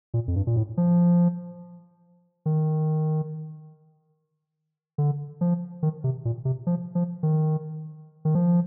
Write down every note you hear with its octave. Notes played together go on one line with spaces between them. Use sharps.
A#2
F2
G2
A#2
A2
F3
D#3
D3
F3
D#3
C3
A#2
C3
F3
F3
D#3
D#3
F3